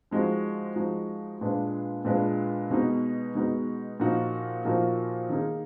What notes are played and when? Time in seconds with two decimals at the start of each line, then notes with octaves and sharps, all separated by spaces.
0.11 F3 G#3 D#4 F#4
0.75 F3 G#3 D#4 F#4
1.41 A#2 G#3 D4 F4 B4
2.05 A#2 G#3 D4 F4 B4
2.70 B2 G#3 B3 D#4 F#4
3.35 B2 G#3 B3 D#4 F#4
4.00 A#2 F3 A#3 D#4 F#4
4.65 A#2 F3 A#3 D#4 F#4
5.29 D#3 A#3 D#4 G#4